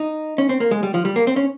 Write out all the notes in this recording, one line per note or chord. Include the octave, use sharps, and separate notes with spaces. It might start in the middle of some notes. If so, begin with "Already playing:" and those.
Already playing: D#4
C#4
C4
A#3
G#3
G3
F3
G3
A#3
C4
C#4